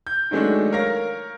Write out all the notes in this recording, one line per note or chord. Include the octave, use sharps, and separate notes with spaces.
G6
D#3 F#3 G#3 A3 D4
A#4 C#5 F5 A#6